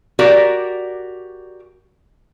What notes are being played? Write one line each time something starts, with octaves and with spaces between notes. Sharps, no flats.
F#4 G4 A#4 D5 F#5